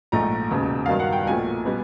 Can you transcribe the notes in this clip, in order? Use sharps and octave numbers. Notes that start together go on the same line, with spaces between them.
A#1 G#2 F3 A3 A#5
E1 D#2 C#3
G2 D#3 F#3 F5
F#5
G5
B1 A#2 F3 A3 G#5
B2 G3 B3